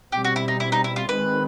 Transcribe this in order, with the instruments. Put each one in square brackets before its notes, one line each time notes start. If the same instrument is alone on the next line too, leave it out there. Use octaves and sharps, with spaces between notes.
[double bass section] B2 G3 C4 [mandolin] G4
[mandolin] F#4
E4
D#4
E4
D#4
E4
F4
[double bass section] D#3 G#3 C4 [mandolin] B4